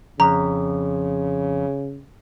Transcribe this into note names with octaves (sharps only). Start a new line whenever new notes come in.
F2 C#3 A#5